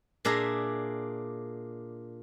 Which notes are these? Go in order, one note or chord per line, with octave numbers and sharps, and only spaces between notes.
A#2 D4 G#4 E5 A#5